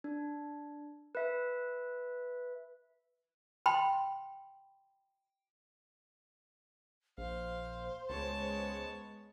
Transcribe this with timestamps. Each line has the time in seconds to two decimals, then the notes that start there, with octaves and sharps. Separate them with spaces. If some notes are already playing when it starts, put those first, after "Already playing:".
0.04 D4
1.15 B4 E5
3.66 G5 B5 C6
7.18 A#1 C5 F5
8.10 C#2 G#3 B3 C#5 A5